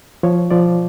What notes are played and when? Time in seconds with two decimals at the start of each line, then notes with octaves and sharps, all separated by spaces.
0.23 F3 C#5
0.51 F3 D5